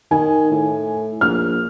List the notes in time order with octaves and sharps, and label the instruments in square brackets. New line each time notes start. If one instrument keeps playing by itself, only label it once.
[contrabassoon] D#3 [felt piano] G#5
[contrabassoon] A2
[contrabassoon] A#1 [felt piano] F6